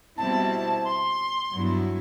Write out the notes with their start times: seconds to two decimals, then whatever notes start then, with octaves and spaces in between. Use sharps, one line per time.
0.16 B2 G3 C4 E4 A5
0.84 C6
1.53 G2 F#3 B3 E4